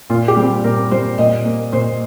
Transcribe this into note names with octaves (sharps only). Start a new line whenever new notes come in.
A#2 F4
G4
G3 C4
A#2 A#4
G3 C4 C5
A#2 D#5
A#3
A#2 C5